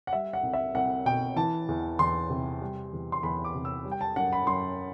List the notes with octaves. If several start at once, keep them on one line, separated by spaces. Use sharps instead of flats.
F#5
G3 E5
F#5
C2
E5
C2 F#5
B2 G5
E3 A5
E2
E2 C6
C3
G3
E2
C6
E2 B5
D6
C3
E6
G3
G5
A5
F#2 F#5
B5
F#2 C6